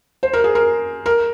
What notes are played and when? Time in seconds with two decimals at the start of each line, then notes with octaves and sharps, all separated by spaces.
0.23 C5
0.33 A#4
0.44 G#4
0.55 A#4
1.06 A#4